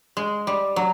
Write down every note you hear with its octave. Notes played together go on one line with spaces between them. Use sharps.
G#3
G3
F#3